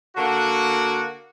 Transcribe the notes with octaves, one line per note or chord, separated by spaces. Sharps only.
D3 A#3 F#4